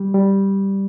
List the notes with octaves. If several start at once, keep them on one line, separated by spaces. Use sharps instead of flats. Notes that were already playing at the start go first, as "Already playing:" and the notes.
Already playing: G3
G3